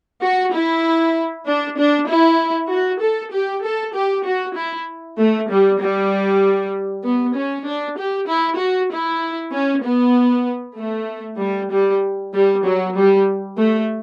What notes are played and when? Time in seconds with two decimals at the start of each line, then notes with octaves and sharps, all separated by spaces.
0.21 F#4
0.52 E4
1.45 D4
1.76 D4
2.07 E4
2.70 F#4
3.01 A4
3.32 G4
3.63 A4
3.94 G4
4.25 F#4
4.56 E4
5.18 A3
5.49 G3
5.80 G3
7.04 B3
7.36 C#4
7.67 D4
7.98 G4
8.28 E4
8.59 F#4
8.91 E4
9.53 C#4
9.84 B3
10.78 A3
11.39 G3
11.71 G3
12.33 G3
12.64 F#3
12.95 G3
13.57 A3